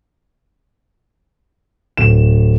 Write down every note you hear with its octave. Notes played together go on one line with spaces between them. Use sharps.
D1 E7